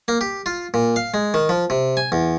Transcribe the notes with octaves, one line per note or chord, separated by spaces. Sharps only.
A#3
G4
F4
A#2
F5
G#3
D#3
F3
C3
G#5
E2